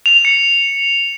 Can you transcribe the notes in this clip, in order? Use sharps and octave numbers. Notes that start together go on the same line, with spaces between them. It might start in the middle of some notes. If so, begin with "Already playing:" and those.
F7
C#7